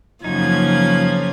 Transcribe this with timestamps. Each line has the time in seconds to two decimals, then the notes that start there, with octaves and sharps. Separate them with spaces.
0.24 F#2 C#3 F3 A#3 C#4 D#4 G#6